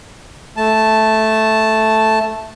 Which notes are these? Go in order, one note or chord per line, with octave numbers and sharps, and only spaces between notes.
A3 A5